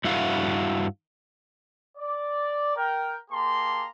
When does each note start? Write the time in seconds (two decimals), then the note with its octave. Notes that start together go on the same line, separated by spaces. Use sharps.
0.04 G2 E4 F#4 F5
1.98 D5
2.76 A#4 G5
3.31 A#3 G4 G#4 A5 A#5 C6